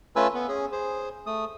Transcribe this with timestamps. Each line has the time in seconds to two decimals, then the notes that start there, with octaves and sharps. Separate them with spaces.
0.16 A3 C#4 F4 B4 G#5 E6
0.34 B3
0.48 C#4 G#4
0.72 G#4 C5
1.26 A3 D#6